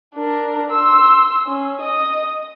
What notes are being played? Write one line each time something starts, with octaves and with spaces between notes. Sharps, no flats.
D4 A#4
C6 E6
C#4
D#5 D#6